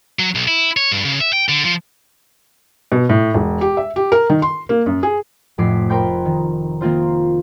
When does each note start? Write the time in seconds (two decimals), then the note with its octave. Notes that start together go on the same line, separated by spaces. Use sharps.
0.19 F#3
0.35 B1
0.48 E4
0.77 C#5
0.92 G2
1.05 C#3
1.20 E5
1.33 G5
1.49 D3
1.64 F3
2.92 B2
3.09 A2
3.34 E1
3.61 G4
3.77 E5
3.96 G4
4.12 A#4
4.30 D#3
4.42 C6
4.69 A#3
4.86 F#2
5.03 G#4
5.58 F1 F2 A2 D6 B6 C7
5.89 A#4 C5 G5 B5 C#6 G6
6.25 D#3
6.81 D#3 A#3 C4 F4 C5